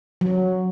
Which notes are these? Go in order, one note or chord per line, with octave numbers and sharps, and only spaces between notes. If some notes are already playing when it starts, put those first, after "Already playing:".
F#3